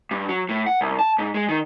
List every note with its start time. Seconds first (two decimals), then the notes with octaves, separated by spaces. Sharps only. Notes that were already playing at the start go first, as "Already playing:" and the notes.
0.11 G2
0.29 F#3
0.49 A2
0.66 F#5
0.81 C2
0.99 A5
1.19 G#2
1.34 G#3
1.49 D#3